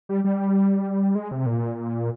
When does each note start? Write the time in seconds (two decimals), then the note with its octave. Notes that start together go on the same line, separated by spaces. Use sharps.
0.09 G3
0.24 G3
1.15 G#3
1.31 C3
1.46 A#2